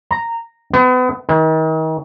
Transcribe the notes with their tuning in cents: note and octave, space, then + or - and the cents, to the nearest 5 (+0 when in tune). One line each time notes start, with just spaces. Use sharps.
A#5 -10
B3 +35
D#3 +35